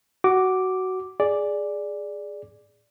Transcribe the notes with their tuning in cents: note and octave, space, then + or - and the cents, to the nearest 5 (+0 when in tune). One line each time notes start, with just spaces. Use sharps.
F#4 +15 D6 +0
G#4 +0 D5 +0